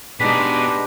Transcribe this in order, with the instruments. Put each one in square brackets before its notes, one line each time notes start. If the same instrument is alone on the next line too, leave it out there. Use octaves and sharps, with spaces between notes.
[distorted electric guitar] B2 G#4 [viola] G#3 D#4 [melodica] D4 G4 B4 [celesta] B6